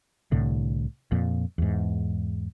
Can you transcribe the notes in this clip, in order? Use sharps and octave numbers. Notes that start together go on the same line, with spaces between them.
C2 A2 D3
F2 A#2
E2 G#2